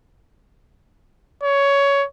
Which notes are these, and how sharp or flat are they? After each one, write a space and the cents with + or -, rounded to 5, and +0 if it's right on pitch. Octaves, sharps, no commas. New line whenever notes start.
C#5 +15